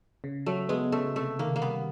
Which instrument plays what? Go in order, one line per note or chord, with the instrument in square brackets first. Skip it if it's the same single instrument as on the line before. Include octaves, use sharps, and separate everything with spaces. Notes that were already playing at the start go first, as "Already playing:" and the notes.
[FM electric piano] C#3
[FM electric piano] F#3 [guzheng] A3
[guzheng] G#3 [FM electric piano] B3
[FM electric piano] C#3 [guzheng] A3
[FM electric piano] C3 [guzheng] A3
[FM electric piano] D#3 [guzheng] A#3
[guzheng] A#3
[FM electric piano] G3 [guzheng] B3